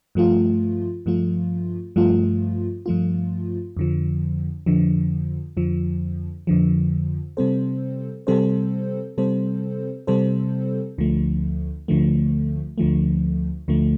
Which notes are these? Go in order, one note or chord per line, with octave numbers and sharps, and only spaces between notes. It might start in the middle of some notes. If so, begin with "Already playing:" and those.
G2 F3 A3 F4
G2 F3 A3 F4
G2 F3 A3 F4
G2 F3 A3 F4
F2 D3 F3
F2 D3 F3
F2 D3 F3
F2 D3 F3
C3 G3 C4 A4 C5
C3 G3 C4 A4 C5
C3 G3 C4 A4 C5
C3 G3 C4 A4 C5
D2 D3 F3 A3
D2 D3 F3 A3
D2 D3 F3 A3
D2 D3 F3 A3